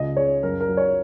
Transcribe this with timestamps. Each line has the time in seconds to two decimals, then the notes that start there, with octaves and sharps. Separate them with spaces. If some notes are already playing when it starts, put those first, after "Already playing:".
Already playing: C#2 D#5
0.17 C#3 C#5
0.43 F#2 A#4
0.60 A#4
0.68 F#3
0.77 C#5